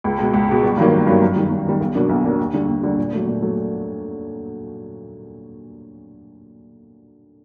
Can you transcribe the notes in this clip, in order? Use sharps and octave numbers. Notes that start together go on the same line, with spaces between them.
C#2
B2 G#3
C#2
B2 G#3
G1
G2 D#3 F#3 A#3
G1
G2 D#3 F#3 A#3
F#2
D#3 G3
F#2
D#3 G3
B1
B2 F#3 A#3 D4
B1
B2 F#3 A#3 D4
D#2
D3 G3
D#2
D3 G3
A#2
F#3 A3
A#2
F#3 A3